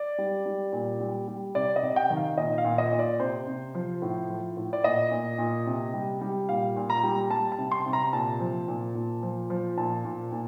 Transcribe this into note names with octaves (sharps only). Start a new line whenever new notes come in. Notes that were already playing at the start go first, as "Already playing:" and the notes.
Already playing: D5
G3
G3
A#2
G3
G3
C3 D5
D#5
C3
G5
D#3
F5
A#2 D#5
F5
A#2
D#5
A#2
D5
C3 C5
C3
F3
A2
F3
A2
D5
A#2 D#5
A#2
A#2
C3
G3
G3
A#2 F5
A#2
A#5
G3
G3 A5
A5
C3
C6
C3
A#5
A#2 A5
F3
A#2
A#2
F3
F3
A#2 A5
A#2
A#2